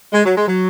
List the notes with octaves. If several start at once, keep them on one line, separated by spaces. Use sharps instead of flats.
G#3
F#3
G#3
F#3